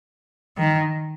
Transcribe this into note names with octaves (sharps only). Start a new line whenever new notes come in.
D#3